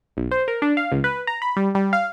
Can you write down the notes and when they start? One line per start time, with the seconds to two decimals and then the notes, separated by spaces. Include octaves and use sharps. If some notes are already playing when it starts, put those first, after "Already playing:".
0.17 B1
0.31 C5
0.48 A#4
0.62 D4
0.77 F5
0.92 C#2
1.04 B4
1.27 A#5
1.42 B5
1.57 G3
1.75 G3
1.93 F5